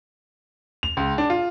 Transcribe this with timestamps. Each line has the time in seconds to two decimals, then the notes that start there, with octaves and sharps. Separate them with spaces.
0.83 F7
0.97 C#2
1.18 D4
1.30 F4